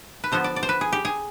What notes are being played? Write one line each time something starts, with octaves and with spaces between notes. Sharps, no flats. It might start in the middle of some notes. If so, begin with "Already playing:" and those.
B4
D3 F3 B3 C5
D5
D5
C5
B4
G#4
G4
G#4